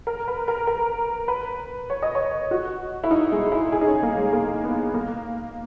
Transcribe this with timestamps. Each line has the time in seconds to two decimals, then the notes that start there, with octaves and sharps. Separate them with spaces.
0.07 A#4
0.28 B4
0.48 A#4
0.67 A#4
1.28 B4
1.90 C#5
2.03 D#5
2.15 C#5
2.51 F#4
3.04 E4
3.11 D#4
3.32 G#3
3.52 E4
3.72 G#4
3.81 D#4
3.87 C#4
4.03 A#3
4.18 G#3
4.33 A#3
4.64 B3
4.94 A#3